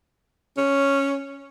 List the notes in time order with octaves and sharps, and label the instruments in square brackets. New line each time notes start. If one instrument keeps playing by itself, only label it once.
[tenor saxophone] C#4